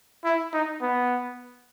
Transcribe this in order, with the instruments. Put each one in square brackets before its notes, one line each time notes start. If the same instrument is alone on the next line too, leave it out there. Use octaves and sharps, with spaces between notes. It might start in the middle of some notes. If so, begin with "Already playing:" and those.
[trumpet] E4
D#4
B3